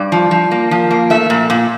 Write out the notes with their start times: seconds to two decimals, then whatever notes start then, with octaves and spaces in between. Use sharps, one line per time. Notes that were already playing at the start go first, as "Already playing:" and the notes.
Already playing: G2 D5
0.12 F3
0.31 F3
0.51 A#3
0.71 F3
0.91 A#3
1.10 A3 E5
1.30 A#2
1.50 A#2